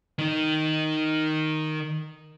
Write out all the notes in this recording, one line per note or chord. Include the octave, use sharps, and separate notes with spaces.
D#3 D#4